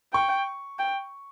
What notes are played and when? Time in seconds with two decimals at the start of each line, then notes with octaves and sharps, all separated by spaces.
0.13 G5 C#6
0.79 G5